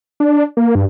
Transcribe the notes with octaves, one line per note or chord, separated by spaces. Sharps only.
D4
A#3
G2